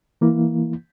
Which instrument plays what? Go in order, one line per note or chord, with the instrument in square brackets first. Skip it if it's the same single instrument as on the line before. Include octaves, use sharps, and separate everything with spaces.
[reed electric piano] E3 A#3 E4